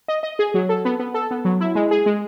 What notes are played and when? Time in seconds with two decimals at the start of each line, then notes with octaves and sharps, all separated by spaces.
0.08 D#5
0.23 D#5
0.39 G#4
0.54 F#3
0.69 A4
0.85 B3
0.99 B3
1.14 A4
1.31 B3
1.45 F#3
1.61 E4
1.75 G#3
1.91 G#4
2.06 G#3